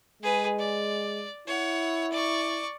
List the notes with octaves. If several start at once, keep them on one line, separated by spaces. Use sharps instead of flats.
G#3 G#4 B4
D5
E4 C#5 F#5
D5 C#6